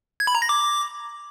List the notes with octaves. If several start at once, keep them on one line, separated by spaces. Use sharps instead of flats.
G#6
B5
A#5
A#6
D6